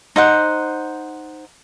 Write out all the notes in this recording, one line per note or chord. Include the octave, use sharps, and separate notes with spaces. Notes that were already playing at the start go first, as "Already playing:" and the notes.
D#4 C5 F#5